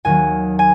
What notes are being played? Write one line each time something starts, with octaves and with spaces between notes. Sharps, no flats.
D#2 D#3 F#3 G#5
G#5